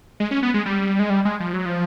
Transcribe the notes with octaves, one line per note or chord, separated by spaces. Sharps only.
G#3
C#4
B3
G#3
G3
G#3
G3
G#3
F3
F#3
F3